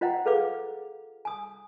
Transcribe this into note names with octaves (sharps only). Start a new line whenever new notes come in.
F4 C5 D#5 F#5 G5 A#5
G#4 A4 B4 F5 D6
G#5 D#6